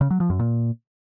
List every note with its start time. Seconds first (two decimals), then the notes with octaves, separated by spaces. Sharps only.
0.01 C#3
0.10 F#3
0.20 F3
0.30 F#2
0.39 A#2